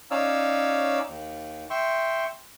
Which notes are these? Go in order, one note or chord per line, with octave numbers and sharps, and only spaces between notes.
C#4 D#4 C#5 D5 F5 E6
D#2
E5 G5 C6 C#6